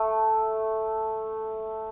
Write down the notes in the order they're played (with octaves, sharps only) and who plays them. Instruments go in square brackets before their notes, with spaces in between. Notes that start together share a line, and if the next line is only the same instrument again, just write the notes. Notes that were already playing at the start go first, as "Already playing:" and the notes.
Already playing: [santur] A3